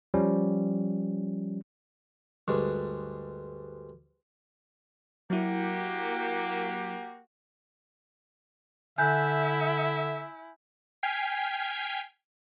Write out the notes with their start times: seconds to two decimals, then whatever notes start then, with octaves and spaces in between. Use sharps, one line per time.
0.14 F3 G3 C#4
2.48 D2 G2 G#3
5.30 F#3 A#3 E4 F#4 G4
8.98 D3 E4 E5 G#5 F#6 G6
11.03 G5 G#5 F6 G#6 B6 C7